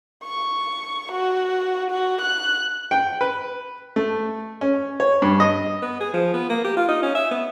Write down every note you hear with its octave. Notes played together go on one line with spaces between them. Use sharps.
C#6
F#4
F#4
F#6
G5
B4
A3
C#4
C#5
G2
D#5
B3
G#4
F3
B3
A#3
G4
F4
D#4
C#4
E5
B3